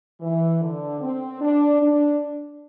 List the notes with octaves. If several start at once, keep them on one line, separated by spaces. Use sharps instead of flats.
E3
D3
C4
D4
D4